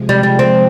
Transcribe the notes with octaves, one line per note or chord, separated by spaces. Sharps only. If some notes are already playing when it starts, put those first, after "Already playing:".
Already playing: C3 F3 G#3
G3
G3
C4